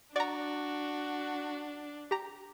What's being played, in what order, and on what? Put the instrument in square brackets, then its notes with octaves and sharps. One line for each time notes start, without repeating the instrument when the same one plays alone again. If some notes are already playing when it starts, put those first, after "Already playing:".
[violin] D4 [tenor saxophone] F#4 [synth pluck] D5 A#5
[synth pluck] G4 A#5